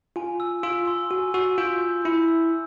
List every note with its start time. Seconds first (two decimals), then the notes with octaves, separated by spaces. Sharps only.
0.16 F4 G#5
0.40 E6
0.63 F4 E6
0.87 C6
1.10 F#4 G#5
1.34 F#4 E6
1.58 F4 G6
1.81 G6
2.05 E4 E6
2.28 E6